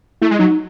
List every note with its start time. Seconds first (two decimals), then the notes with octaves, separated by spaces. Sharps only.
0.22 A3 E4
0.31 G#3
0.39 F#3 D#4